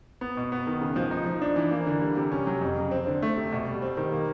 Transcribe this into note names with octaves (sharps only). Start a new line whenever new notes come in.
B3
B2
B3
D#3
C#3
F3
D#4
F3
D4
E3
A#3
D3
G3
C3
C#4
F#3
F2
C#3
C4
D3
A3
C3
B2
G3
C4
D#3
A#3